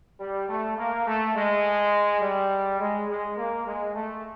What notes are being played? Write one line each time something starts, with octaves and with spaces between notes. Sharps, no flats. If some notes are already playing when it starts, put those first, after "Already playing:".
G3
A3
A#3
A3
G#3
G3
G#3
G#3
A#3
G#3
A3